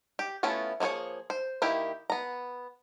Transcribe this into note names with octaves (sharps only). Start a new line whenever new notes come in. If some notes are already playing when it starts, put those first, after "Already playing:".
G4
A3 B3 C#4 E4 F4
F3 A#3 F#4 G#4 C#5
C5
D#3 A#3 E4 G4
B3 A#5